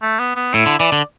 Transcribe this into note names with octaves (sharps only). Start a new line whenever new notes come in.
A3
B3
B3
A2 E4
D3
E3 D5
D3